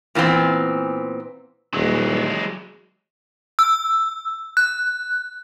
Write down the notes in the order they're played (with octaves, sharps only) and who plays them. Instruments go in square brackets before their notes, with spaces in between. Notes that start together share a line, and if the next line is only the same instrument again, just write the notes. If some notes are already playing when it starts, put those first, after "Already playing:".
[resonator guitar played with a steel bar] A#2 E3 B3 C4
[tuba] D#1 [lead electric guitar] F#3 G#3
[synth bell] E6
F#6